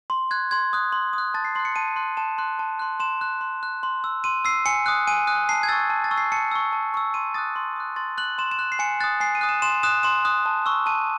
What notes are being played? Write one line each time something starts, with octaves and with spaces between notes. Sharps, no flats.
C6
F#6 G#6
C6 G#6
D#6 F#6
C6
D#6
F#6
A5 A6
C7
C6 F#6 C7
C#7
A5 D#7
C6 F#6
A5 E7
C6 F#6
A5
C6 F#6
C6 E7
F#6
C6
F#6
C6
E6
C6 D#7
E6 C7
G#5 C#7
D#6 F#6
G#5 D#7
D#6 F#6
A5 C7
G#6
C#6 E6 A6
A5
A6
C#6 E6
C7
A5 C#7
C#6 E6
A5
C#6 E6
C6 D#7
D#6 F#6 A6
C6
D#6 F#6
C6 A6
F#6 F#7
C6 E7
E7
F#6
C7
G#5 C#7
D#6 F#6 A6
G#5 C7
D#7
D#6 F#6
E7
C6 E7
D#6 F#6 E7
C6 E7
D#6 F#6
A5
C#6 E6
A5 D#7